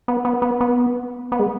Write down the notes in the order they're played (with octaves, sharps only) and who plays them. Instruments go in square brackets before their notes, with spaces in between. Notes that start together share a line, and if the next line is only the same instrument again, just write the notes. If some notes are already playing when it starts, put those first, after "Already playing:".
[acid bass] B3
B3
B3
B3
B3
G#3